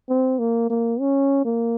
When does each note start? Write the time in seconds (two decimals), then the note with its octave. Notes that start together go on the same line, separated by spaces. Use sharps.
0.09 C4
0.39 A#3
0.70 A#3
1.00 C#4
1.45 A#3